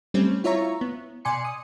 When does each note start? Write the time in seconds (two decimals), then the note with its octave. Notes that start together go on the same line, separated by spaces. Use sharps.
0.14 G3 A3 C4 C#4
0.44 E4 F4 C#5 E5 A#5 C#6
0.81 B3
1.25 B2 D5 G#5 C6 C#7
1.45 D#6